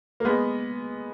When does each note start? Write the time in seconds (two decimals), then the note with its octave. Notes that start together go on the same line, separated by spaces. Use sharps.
0.20 A#3
0.25 G#3 B3